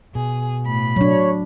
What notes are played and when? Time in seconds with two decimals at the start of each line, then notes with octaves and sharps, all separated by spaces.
0.15 B2 G#4
0.65 A2 B5
0.96 F#3 D4 C#5